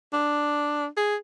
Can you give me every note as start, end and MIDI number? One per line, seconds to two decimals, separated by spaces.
0.13 0.87 62
0.97 1.16 68